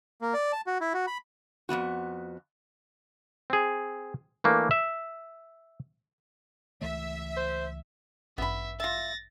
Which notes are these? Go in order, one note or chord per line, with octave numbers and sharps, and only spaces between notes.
A#3
D5
A5
F#4
E4
F#4
B5
F2 D#3 B3 F#4
C4 G#4
E3 A3 A#3 D4
E5
C#2 E3 A3 E5
C5
A1 G2 B3 E5 B5
F4 E5 A6 A#6